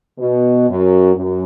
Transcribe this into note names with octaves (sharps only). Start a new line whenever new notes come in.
B2
F#2
F#2